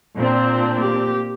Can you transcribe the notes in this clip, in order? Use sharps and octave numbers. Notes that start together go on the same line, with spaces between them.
A#2 C4 D4
A#3 G4